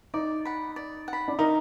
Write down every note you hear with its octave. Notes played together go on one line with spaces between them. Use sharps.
D#4 D5
F#5 B5
D5
F#5
B5
D4
D#4 A#4